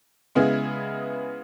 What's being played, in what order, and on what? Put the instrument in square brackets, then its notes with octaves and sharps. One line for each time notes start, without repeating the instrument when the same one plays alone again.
[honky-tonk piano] C#3 G#3 B3 E4 G#4